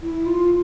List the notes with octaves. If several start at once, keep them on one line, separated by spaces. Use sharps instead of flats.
E4
F4